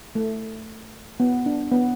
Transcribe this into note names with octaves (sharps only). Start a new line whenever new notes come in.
A3
B3
D4
B3